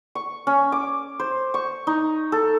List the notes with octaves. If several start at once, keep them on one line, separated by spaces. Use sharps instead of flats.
C#6
C#4
D6
C5
C#6
D#4
A4